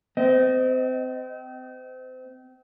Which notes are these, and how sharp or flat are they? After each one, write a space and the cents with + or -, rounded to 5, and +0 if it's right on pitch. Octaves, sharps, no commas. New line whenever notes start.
C4 -30 D#5 +10